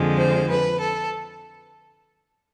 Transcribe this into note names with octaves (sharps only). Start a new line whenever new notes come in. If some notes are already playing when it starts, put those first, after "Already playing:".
Already playing: F2 D3 F3 G#3
C5
B4
A4